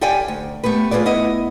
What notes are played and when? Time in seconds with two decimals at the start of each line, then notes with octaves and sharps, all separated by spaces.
0.01 G4 A4 D5 F5 G5 G#5
0.28 D2
0.64 A3 B3 G4 B4
0.91 F4 F#4 G#4 B4 D5
1.06 B3 E4 D#5